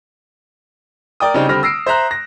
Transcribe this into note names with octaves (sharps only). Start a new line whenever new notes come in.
A#4 D5 G5 D#6
C#3 G3 C4 D4 D#4
D3 G3 C4 B5 F6 A#6
E6 A#6 C7 D7
C5 E5 A#5 F#6
A#6